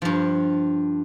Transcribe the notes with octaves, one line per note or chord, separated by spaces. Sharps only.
G2 F3